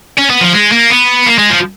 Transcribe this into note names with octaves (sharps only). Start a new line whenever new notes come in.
C#4
B3
F3
G#3
A#3
B3
A#3
G#3
F3